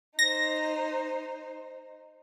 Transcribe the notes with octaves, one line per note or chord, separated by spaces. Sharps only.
D#4 C5 A#6